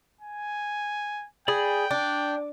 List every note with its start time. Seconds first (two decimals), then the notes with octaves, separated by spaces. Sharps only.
0.21 G#5
1.48 G#4 D5 G5 B5 D#6
1.91 D4 D6